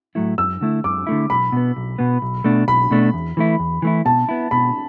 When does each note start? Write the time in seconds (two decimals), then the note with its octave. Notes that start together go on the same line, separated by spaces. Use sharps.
0.15 A2 F#3 A3 E4
0.38 F#2 E6
0.61 D3 A3 E4
0.84 F#2 D6
1.07 D3 A3 E4
1.30 B1 B5
1.52 B2 B3
1.77 B1
1.99 B2 B3
2.22 B1
2.44 B2 A3 D4
2.68 B1 B5
2.91 B2 A3 D4
3.14 E2
3.37 E3 A3 E4
3.59 E2
3.82 E3 A3 E4
4.05 B2 A5
4.29 B3 E4
4.51 B2 B5